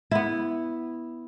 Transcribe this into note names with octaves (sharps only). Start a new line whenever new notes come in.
B3 E4